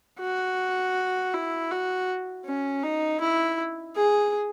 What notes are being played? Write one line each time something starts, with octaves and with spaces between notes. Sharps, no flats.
F#4
E4
F#4
C#4
D#4
E4
G#4